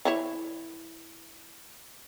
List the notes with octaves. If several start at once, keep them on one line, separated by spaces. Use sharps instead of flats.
E3 E4 C#5